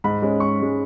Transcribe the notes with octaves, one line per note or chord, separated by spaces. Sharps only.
G#2 B5
G#3 C#4
G#2 C#6
G#3 C#4